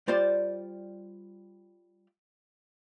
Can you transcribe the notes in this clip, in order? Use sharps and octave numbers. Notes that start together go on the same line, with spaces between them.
G3 F4 C5 D5 C6